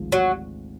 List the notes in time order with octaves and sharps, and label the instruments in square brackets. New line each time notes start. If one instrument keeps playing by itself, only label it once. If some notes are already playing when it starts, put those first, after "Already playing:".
Already playing: [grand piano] G#1 D2 G#2 F3
[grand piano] G#1 [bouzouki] F#3